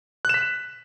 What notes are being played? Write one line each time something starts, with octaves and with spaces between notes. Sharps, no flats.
F#6 B6 E7